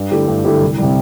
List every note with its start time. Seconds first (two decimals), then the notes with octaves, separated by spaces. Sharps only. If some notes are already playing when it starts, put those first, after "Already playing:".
Already playing: G2
0.11 D3 A3 E4 G4
0.27 G2
0.44 D3 A3 E4 G4
0.62 C2
0.78 C3 G3